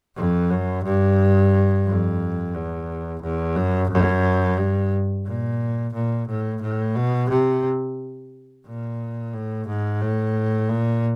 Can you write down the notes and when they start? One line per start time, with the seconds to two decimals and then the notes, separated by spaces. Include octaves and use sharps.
0.16 F2
0.50 F#2
0.85 G2
1.87 F2
2.54 E2
3.22 E2
3.56 F#2
3.90 F#2
4.58 G2
5.26 A#2
5.94 A#2
6.28 A2
6.62 A2
6.96 B2
7.30 C3
8.66 A#2
9.34 A2
9.67 G#2
10.01 A2
10.69 A#2